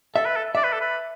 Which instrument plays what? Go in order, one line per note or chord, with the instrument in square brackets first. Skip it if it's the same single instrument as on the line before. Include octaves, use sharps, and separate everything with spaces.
[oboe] A4 [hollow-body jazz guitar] E5
[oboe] B4
A4
[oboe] D5 [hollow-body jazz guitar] E5
[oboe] B4
A4
B4